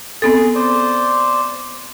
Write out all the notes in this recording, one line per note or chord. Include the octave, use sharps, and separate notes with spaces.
B3 C4 G#4 A4
C5 D5